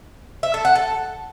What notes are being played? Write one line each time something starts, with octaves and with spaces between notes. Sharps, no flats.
E5
A4
F#5
A4